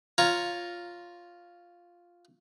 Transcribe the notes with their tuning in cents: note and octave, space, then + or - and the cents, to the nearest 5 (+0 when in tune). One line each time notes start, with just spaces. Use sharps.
F4 +0 C#5 +0 A#5 +0